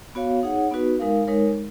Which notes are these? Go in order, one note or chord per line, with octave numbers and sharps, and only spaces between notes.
B3 F#4 C#5 F5
D#4 G#4 C#5 F#5
B3 D#4 F#4 B4
G#3 D#4 A#4 F5
G#3 D#4 A#4 C#5